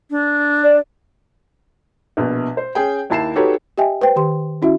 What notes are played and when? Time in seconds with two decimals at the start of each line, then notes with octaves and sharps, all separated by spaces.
0.11 D4
0.63 D5
2.17 A#1 B2
2.57 C5
2.75 C#4 G#4 G5
3.10 D#2 E4 A5 C7 E7
3.35 D#4 F#4 G4 A4 B4 C#5
3.78 G4 D#5 E5 G5 G#5
4.01 B4 C5 G5
4.16 D#3 G4 C6
4.62 C#4 E4 F#4 E5